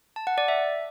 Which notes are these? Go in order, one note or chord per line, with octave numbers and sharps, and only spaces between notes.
A5
F#5
D5
E5